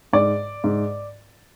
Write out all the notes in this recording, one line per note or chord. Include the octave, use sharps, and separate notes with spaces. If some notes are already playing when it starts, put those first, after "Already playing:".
G#2 D5
G#2